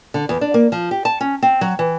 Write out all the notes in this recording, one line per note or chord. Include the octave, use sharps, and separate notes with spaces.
D3
E2
D4
A#3
F3
G4
A5
C#4
C4
F#3
E3